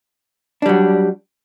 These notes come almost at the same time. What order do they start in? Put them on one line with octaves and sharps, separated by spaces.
D4 G3 F#3